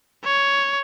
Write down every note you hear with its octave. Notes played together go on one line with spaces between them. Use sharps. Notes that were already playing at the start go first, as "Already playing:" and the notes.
C#5